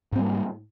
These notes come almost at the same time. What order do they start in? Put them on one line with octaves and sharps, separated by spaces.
G#2 C4 G3 A#3